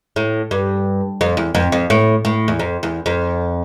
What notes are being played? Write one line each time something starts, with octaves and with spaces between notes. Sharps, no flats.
A2
G2
F2
E2
F2
F2
A2
A2
E2
F2
E2
F2